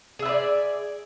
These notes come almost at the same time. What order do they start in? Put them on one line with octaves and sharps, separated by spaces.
G#4 E5 B4 D5